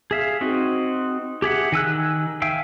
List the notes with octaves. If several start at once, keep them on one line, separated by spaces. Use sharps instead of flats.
G#4 E5 F5
C4 D#4 F#4
G4 G#4 E5 F#5
D#3 G#5 E6 F#6
E5 F5 G5 G#5 E6